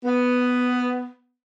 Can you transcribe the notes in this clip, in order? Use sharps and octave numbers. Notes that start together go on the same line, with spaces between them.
B3